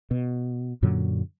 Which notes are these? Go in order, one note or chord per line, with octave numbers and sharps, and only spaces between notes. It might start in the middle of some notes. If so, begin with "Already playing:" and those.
B2
F#2 A#2 D3 F#3